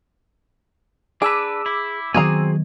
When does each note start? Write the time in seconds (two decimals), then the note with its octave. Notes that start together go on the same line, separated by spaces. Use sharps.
1.22 D4 G#4 B4 D6 E6
1.66 E4
2.14 D#3 F#3 B3 C4 F#4 G#4 G#5 A#5